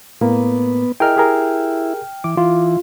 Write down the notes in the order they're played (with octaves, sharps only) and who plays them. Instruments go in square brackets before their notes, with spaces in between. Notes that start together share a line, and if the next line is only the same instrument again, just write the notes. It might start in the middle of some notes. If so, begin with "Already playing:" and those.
[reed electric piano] A2 A#3 [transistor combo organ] B3
[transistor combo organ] E4 [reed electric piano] G#4 A#4 D#5 [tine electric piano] G5 F6
[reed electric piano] G4 G#4 A#4
[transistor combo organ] E3 [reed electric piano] D6
[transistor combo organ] E3 [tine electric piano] F4